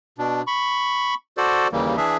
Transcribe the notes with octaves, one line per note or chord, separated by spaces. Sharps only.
B2 D4
B5 C#6
F#4 A4 C5 D5
D#2 C#3 E3 G3 A#3
E3 D4 G#4 E5